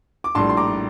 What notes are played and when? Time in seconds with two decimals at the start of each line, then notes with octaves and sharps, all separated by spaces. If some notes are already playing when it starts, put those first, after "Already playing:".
0.24 D6
0.35 A#1 A2 G3 A5 C6
0.50 C6
0.57 A#5 D6